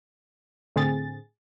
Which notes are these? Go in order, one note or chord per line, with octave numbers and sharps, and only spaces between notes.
A2 D3 C4 G#4 A6